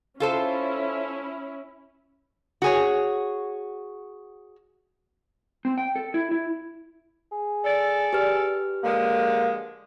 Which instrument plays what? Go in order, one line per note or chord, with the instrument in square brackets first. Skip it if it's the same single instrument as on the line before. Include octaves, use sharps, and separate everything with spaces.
[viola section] C#4 E4 [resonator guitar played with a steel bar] F4 A4 C5
[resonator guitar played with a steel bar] F#4 G#4 C#5
[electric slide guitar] C4
G5
A4
E4
E4
[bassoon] G#4
[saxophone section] A4 D5
[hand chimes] G4 B4 F6
[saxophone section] D3 F3 G#3 [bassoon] A#3